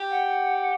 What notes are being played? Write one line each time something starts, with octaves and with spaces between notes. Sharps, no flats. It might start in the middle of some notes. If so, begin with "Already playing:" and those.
Already playing: G4
F#5